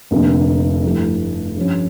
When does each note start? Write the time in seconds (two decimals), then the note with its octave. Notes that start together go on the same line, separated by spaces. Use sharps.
0.11 F1 F2 D3 F3 A#3
0.83 G2 F3 A3 E4
1.57 G2 F3 C#4